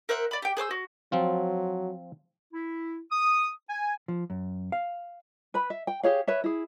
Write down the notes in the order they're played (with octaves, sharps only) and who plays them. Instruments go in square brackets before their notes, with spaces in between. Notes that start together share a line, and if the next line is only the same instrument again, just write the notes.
[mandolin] A#4 C5 E5 F#5
D5 B5
G4 G5
G#4 C5 D6 E6
F#4
[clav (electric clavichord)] F3 C4 F4 [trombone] F#3
[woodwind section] E4
D#6
G#5
[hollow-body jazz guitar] F3
F#2
F5
[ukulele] B4 B5
E5
G5
G4 G#4 C#5 F5
B4 C#5 E5
E4 G#4